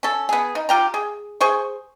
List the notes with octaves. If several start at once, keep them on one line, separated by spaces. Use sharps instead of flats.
C#4 A4
B3 G#4
D#4
F4 G4 A#5
G#4
G#4 C5 C#6